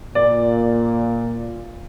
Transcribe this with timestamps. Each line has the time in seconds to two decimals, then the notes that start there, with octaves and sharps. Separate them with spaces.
0.15 A#2 D5